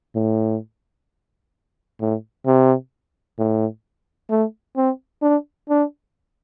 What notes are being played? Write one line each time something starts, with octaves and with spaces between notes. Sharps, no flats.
A2
A2
C3
A2
A3
C4
D4
D4